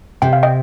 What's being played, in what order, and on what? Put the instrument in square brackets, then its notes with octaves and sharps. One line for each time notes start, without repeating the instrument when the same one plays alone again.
[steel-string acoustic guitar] C3 [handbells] G5
[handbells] F5
D#5 G5